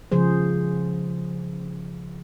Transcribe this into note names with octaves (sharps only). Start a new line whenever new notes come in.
C#3 F3 G#4 C5